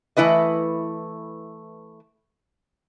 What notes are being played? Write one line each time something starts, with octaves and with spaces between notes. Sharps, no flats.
E3 A3 E4 B4 D#5